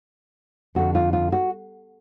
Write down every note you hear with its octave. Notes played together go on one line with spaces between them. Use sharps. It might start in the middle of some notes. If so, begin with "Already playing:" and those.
F2 D3 F#4
F4
F4
F#4